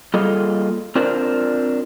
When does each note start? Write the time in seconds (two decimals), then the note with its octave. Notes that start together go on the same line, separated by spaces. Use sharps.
0.14 G3 A#3 F4 G#4 A4 D#5
0.95 C4 D4 F4 A#4 C5 D5